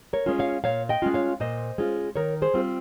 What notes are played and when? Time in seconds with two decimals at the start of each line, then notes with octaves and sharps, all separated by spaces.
0.13 A#4 C#5
0.26 G#3 C#4 F4
0.39 C#5 F5
0.64 A#2 C#5 F5
0.89 D#5 G5
1.02 G#3 C#4 F4
1.14 C#5 F5
1.40 A#2 C5 D#5
1.78 G#3 C#4 F4
2.16 D#3 A#4 C#5
2.42 G#4 C5
2.54 G3 C4 F4